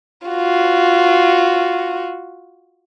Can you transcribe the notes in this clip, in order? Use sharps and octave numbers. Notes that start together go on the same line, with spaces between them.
F4 F#4